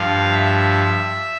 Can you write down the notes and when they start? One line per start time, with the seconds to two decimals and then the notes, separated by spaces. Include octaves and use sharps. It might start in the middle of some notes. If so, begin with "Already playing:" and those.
Already playing: G2 F3 F5
0.32 E5